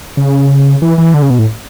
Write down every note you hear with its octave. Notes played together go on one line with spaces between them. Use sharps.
C#3
E3
E3
D3
C#3
B2
A2